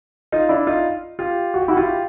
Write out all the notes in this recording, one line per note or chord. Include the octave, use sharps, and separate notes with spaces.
D#4 F4
D4 E4
D#4 F4
F4 G4
F#4
G4
E4 F#4
F4 G4